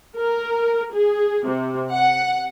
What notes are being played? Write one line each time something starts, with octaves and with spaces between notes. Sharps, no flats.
A#4
G#4
C3
F#5